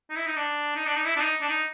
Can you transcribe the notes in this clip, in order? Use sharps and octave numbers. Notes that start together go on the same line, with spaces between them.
D#4
E4
D#4
D4
D#4
D4
D#4
E4
D4
D#4
D4
D#4